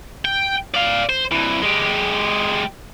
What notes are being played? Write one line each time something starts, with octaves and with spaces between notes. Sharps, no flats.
G5
D5 F5
C5
C2 E3
G#3 G4